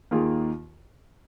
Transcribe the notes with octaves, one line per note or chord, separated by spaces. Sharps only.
D#2 D#3 A#3 F4 G#4